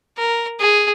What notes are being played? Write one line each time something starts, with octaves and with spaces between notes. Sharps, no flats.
A#4
G#4